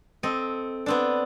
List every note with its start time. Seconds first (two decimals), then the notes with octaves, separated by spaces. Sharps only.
0.23 C4 A4 D#5
0.86 B3 C4 D4